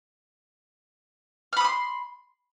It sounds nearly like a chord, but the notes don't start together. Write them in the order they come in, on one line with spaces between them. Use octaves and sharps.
F6 B5 D#6 C6